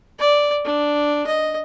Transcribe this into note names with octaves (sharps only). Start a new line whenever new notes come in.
D5
D4
D#5